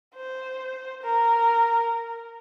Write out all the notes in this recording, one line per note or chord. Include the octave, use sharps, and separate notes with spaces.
C5
A#4